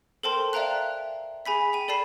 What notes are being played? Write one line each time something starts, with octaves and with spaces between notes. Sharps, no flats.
A4 A#4 C5 G5 A5 C6
D5 E5 F5 G5 A#5 F#6
G#4 G#5 B5 B6
G5 D#7
A4 D5 A5 B5 C7